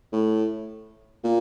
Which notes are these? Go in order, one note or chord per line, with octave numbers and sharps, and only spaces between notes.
A2
A#2